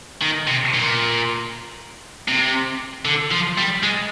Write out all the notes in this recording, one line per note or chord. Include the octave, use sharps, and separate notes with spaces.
D#3
C3
A#2
C3
D3
F3
G3
G#3